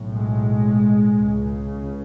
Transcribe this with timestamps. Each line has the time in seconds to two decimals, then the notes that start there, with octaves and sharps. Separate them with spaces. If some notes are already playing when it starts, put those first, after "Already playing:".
Already playing: B1 A2
0.13 G#3
1.11 C#2 C#3